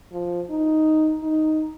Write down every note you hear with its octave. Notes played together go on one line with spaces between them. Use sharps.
F3
D#4
D#4